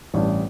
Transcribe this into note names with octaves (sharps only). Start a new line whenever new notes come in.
A1 G2 E3 G3